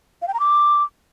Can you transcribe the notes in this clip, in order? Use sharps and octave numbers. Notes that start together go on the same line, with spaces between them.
F5
G5
A#5
D6